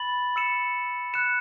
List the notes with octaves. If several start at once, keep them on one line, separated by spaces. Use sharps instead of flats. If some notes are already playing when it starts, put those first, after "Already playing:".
Already playing: B5 A6 F#7
E6 C#7 E7
F#6 C#7 E7